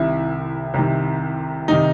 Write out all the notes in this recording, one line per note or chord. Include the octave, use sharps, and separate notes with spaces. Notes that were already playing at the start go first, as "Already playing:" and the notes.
Already playing: C2 C3 D#3 E4
C2 C3 D#3
C3 D#3 D#4